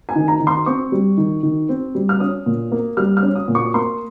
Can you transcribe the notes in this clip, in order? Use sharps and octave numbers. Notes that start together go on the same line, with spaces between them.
G#5
D#3
A#5
D#3
C6
C4 C#6
G3
D#3
D#3
C4
G3
F6
C#4 D#6
A#2
A#3
G3 F6
F6
C#4
D#6
A#2
C#6
A#3 C6